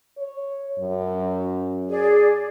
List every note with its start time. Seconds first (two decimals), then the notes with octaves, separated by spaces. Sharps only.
0.18 C#5
0.79 F#2
1.89 G#4 D5